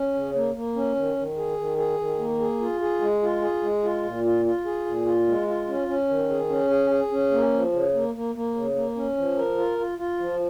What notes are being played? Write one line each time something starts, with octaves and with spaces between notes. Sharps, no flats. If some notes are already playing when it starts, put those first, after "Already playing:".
Already playing: C#4
C#3
A#3
A#3
C#4
D#3
D#3
G#4
D#3
G#4
D#3
A#3
G#4
F4
G#4
G#3
F4
G#4
G#3
F4
A#2
F4
F4
G#4
A#2
F4
G#3
F4
C#4
C#4
D#3
G#4
C#4
G#4
G#4
C#4
A#3
F3
C#3
A#3
A#3
A#3
C#3
A#3
C#4
F3
A#4
F4
F4
F4
F3